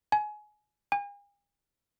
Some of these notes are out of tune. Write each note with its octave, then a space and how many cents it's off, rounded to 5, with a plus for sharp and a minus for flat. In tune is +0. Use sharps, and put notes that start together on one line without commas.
G#5 +25
G#5 -45